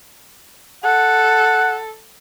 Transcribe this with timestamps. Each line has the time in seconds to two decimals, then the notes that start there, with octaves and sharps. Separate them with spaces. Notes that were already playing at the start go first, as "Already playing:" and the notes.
0.85 A4 F#5